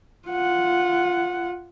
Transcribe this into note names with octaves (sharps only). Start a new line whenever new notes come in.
F4 F#5